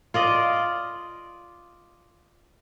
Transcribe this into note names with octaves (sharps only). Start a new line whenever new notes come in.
F4 D5 D#5